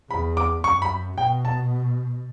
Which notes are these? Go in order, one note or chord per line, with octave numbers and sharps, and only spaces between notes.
E2 B5
D6
F#2 C#6
B5
B2 G5
A5